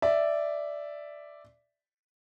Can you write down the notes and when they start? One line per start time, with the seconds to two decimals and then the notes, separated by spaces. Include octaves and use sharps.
0.02 D5 E5